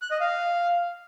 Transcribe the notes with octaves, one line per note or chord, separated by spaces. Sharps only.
F#6
D#5
F5